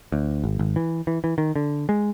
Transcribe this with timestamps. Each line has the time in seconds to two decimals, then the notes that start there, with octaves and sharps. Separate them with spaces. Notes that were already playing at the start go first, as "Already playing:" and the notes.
0.12 D2
0.44 G#1
0.59 G#1
0.76 E3
1.07 E3
1.24 E3
1.38 D#3
1.56 D3
1.89 G#3